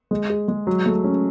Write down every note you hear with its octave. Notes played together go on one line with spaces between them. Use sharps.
G#3
G#4
G#3
F#3
A3
C#4